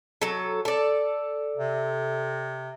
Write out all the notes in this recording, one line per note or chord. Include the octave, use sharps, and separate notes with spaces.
F#3 A4
A4 D5
C3